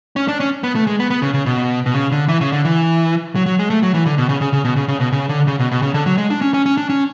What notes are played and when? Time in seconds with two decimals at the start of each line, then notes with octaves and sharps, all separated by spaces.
0.16 C#4
0.28 D4
0.40 C#4
0.63 B3
0.75 A3
0.87 G#3
1.00 B3
1.10 B3
1.22 C#3
1.34 C#3
1.46 B2
1.86 B2
1.94 C#3
2.12 D3
2.28 E3
2.41 C#3
2.52 D3
2.65 E3
3.36 F#3
3.46 F#3
3.59 G#3
3.70 A3
3.83 F#3
3.94 E3
4.06 D3
4.18 B2
4.29 C#3
4.41 C#3
4.53 C#3
4.65 B2
4.76 C#3
4.88 C#3
5.00 B2
5.13 C#3
5.29 D3
5.47 C#3
5.59 B2
5.71 B2
5.82 C#3
5.94 D3
6.06 F#3
6.18 G#3
6.30 D4
6.41 C#4
6.54 C#4
6.66 C#4
6.77 D4
6.89 C#4